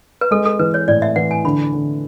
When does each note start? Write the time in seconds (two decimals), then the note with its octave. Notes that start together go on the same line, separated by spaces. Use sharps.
0.21 B4
0.31 G#3 A4
0.45 A4
0.59 E3 B4
0.74 C#5
0.88 A2 D5
1.02 E5
1.16 E3 F#5
1.31 G#5
1.44 D3 B5
1.72 D3